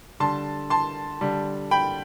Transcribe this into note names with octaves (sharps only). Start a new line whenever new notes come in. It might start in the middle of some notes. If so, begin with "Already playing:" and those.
D3 G3 A5 C6
A5 C6
D3 G3
G5 B5